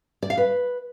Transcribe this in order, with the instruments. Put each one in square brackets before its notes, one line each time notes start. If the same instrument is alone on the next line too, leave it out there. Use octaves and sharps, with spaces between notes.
[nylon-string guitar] D5
F5
B4